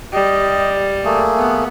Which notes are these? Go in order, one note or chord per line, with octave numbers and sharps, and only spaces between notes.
G3 D#5
A3 A#3 G#4
B3